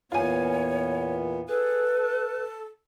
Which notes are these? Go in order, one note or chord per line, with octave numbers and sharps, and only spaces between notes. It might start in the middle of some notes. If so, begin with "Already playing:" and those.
E2 A#2 B3 F4 C#5 G#5
G#4 A4 B4
A5